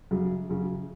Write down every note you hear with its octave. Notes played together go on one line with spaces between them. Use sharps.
F#2 C#3 F#3
F#2 C#3 F#3